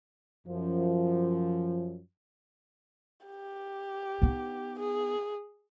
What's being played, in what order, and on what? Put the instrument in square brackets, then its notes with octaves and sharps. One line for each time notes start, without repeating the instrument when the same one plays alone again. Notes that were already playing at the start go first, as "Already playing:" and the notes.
[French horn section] F#2 F3
[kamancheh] G4
[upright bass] B3 D#4
[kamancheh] G#4